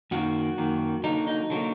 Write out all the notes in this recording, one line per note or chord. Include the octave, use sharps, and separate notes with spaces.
F#2 D#3 A#3 F#4
F#2 D#3 A#3
D3 F#3 A#3 D#4
D#4
D3 F#3 A#3